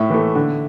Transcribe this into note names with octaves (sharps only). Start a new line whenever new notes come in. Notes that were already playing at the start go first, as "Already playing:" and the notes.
Already playing: A2 E5
E3 A3
D3